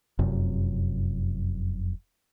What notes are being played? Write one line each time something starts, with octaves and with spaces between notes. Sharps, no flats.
F1 F#2 C3